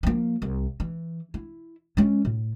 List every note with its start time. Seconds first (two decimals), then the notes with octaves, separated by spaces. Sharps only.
0.03 F3 A#3
0.42 C2
0.80 E3
1.34 E4
1.97 G#3 C#4
2.25 A2